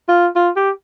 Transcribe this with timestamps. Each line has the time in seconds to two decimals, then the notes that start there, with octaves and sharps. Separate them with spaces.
0.08 F4
0.36 F4
0.56 G4